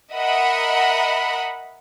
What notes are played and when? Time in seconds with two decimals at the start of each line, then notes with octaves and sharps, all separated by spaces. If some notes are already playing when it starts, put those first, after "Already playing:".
0.12 A#4 D#5 E5 F#5 B5